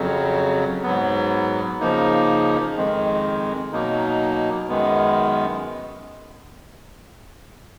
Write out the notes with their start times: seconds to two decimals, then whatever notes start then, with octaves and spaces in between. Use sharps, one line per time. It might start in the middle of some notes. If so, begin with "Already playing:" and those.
Already playing: F2 C#3 F#3
0.83 G#2 F#3 B3
1.80 C#3 F3 A#3 D#4
2.77 F2 D#3 G#3
3.73 B2 F#3 A#3 D#4
4.69 F#2 D#3 G#3 B3